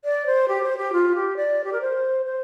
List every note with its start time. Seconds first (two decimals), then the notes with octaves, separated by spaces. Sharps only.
0.04 D5
0.26 C5
0.48 G4
0.63 C5
0.77 G4
0.92 F4
1.15 G4
1.36 D5
1.64 G4
1.72 A#4
1.81 C5
2.25 C5